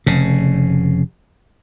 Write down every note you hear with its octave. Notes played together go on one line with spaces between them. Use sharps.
F1 C#3